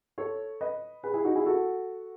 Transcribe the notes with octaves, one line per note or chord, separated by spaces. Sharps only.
A4 C#5
B4 D#5
G#4 B4
E4 G#4
D#4 F#4
E4 G#4
F#4 A4